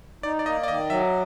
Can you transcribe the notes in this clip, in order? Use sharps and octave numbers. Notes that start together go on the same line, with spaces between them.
D#4 D5
D5
A#3 D#5
D5
D#3 D#5
F#3 E5